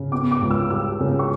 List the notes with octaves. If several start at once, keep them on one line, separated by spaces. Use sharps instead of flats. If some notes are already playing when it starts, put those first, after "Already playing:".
Already playing: C#3
B3 D6
D6
C#2
E6
G3 E6
C#3
C#6